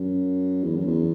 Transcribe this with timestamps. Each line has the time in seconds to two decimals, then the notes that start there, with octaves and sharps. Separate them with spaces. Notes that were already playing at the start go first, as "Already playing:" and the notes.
Already playing: F#2
0.64 E2
0.76 F#2
0.87 E2